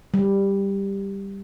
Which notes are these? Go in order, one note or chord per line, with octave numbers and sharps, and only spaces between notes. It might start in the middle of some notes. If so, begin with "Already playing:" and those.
G3